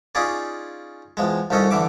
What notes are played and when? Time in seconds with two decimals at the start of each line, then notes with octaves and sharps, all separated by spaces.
0.15 C#4 D#4 F4 G#4 D5
1.17 E2 F3 G#3
1.50 C2 F2 D#3 C#4 A4 D#5
1.71 A1 D3 E3 E5 D6